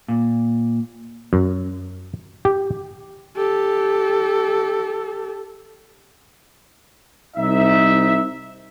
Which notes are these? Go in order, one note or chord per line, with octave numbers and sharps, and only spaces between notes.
A#2
F#2
G4
G4 A4
C2 D#4 E5